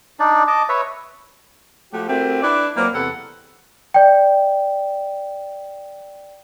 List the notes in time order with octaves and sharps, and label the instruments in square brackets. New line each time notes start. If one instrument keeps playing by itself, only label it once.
[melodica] D4 D#4 D5
D#5 A5 D6
B4 C#5 E5
[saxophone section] F3 A3 F#4 G4
A3 C4 E4 F#4 G4 A#4
D4 E4 B4 D5
F#3 A#3 C4 B4 D5
E2 C3 A4 B4 F#5
[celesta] D5 G5